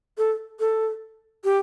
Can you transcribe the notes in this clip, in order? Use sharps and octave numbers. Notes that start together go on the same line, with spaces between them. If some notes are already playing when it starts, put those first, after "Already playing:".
A4
A4
G4